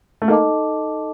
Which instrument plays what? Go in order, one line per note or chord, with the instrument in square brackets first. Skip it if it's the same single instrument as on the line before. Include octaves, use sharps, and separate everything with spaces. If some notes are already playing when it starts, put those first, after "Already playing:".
[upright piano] A3
[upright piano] A#3 [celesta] D#4 A4 D#5 A5 D6